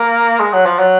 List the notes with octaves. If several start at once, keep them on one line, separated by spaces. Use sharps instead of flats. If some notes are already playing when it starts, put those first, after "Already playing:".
Already playing: A#3
G#3
F#3
F3
F#3